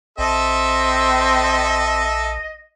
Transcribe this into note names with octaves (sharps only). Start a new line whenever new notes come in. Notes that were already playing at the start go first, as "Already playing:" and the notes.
A#1 C4 A4 D#5 E5